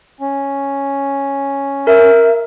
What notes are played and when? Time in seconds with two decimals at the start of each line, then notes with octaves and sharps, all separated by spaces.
0.20 C#4
1.87 A#4 E5